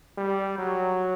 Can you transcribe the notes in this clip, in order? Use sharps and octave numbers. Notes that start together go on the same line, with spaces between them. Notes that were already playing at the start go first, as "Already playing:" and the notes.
G3
F#3